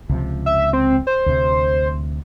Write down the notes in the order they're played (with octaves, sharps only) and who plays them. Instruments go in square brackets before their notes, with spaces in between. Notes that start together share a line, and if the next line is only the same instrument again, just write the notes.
[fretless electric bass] C#2 C3 F3
[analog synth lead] E5
C4
C5
[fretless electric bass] D2 C3